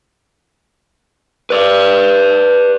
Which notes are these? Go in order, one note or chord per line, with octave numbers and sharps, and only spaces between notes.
B4 D5